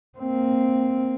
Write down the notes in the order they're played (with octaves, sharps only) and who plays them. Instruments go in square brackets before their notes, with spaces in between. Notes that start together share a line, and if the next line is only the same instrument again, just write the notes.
[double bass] A#3 C4